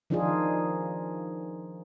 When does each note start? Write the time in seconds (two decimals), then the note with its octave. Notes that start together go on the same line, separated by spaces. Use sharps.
0.10 D#3 F3 D4 D#4 F4 G#4